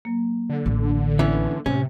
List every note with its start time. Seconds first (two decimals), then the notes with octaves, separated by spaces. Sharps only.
0.05 F#3 A#3
0.49 D3
0.66 A1
1.19 E3 B3 C#4
1.66 A2 C3 C#4